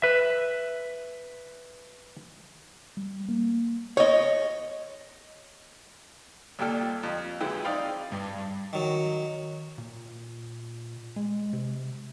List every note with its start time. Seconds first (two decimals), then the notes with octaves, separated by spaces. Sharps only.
0.02 B4 E5
2.97 G3
3.28 A#3
3.97 C#5 D#5
6.59 C2 A#2 G3 A4 G5 F6
7.03 F2
7.41 F#2 E3 G#3 E4 G5
7.64 C4 D#4 D5 F5 G5 B5
8.12 G2
8.73 D#3 F#3
9.78 A#2
11.16 G#3
11.53 C3